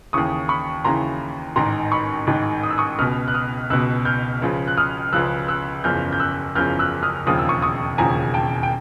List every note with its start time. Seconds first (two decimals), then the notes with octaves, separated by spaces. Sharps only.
0.13 D#2 C#3 E3 C#6 D#6
0.49 B5 C#6
0.84 D#2 C#3 E3 A#5 C6
1.56 A1 G#2 D#3 A#5 C6
1.92 B5 C#6
2.27 A1 G#2 D#3
2.63 D#6
2.70 E6
2.78 C#6 D#6
2.99 C#2 B2 D#6 F6
3.28 F#6
3.34 D#6 F6
3.70 C#2 B2 E6 F#6
4.05 F6 G6
4.42 C#2 C#3 F3
4.67 F#6
4.77 D#6 F6
5.13 C#2 C#3 F3 E6 F#6
5.48 E6 F#6
5.84 F#1 E2 C#3 F3 F6 G6
6.13 G6
6.20 E6 F#6
6.56 F#1 E2 C#3 F3 F6 G6
6.79 E6 F#6
7.03 D#6 F6
7.27 E1 D#2 C#3 F3 D#6
7.39 E6
7.49 C#6 D#6
7.62 C#6 D#6
7.98 E1 D#2 C#3 F3 G#5 A#5
8.34 G5 A5
8.63 G5